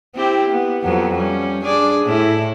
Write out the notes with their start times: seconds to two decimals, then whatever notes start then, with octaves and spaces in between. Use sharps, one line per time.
0.15 C4 E4 G4
0.50 B3
0.84 F2 F#3 B3
1.16 G3 C#4
1.63 D4 G#4 D5
2.05 A2 E4